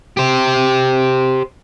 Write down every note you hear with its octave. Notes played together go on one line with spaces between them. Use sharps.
G4 C5